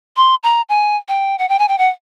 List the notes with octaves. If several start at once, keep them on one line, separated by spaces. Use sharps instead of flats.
C6
A#5
G#5
G5
F#5
G5
G#5
G5
F#5